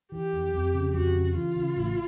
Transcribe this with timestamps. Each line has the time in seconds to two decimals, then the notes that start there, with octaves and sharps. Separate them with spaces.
0.12 E3 G4
0.33 F2
0.54 F2
0.74 C#3
0.94 F2 F#4
1.15 C#3
1.35 E3 F4
1.56 C#3
1.77 A1